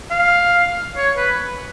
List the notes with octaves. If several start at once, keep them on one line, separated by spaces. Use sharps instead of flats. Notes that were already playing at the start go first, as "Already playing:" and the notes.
F5
C#5
B4